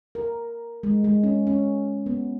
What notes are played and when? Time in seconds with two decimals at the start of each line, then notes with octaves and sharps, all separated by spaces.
0.15 A#4
0.83 G#3
1.04 G#3
1.23 C#4
1.47 C#4
2.06 B3